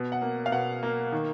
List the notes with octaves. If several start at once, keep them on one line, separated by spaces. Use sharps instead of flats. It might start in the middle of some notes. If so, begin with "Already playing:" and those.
Already playing: B2
F#5
A#3
F5
B2 F#5
A#3
D#3